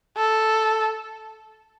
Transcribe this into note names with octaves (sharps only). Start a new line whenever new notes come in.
A4